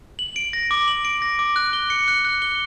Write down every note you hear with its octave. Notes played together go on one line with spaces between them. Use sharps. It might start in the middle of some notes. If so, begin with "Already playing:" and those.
F#7
D7
A#6
D6
F#7
D7
A#6
D6
F#6
G7
C#7
F#6
F#6
G7